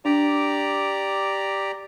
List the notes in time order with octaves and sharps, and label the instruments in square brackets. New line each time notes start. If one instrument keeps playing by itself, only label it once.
[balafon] D4 [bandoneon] G4 D5 A#5